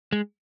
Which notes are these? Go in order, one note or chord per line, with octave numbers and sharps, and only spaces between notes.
G#3